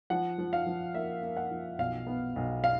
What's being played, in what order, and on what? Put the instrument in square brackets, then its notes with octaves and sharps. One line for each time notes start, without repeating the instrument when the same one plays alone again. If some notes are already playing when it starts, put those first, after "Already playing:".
[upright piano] F3 F#5
F3
F5
F3
A#3 E5
A#3
F#5
F3
B1 F5
B3
B1
F5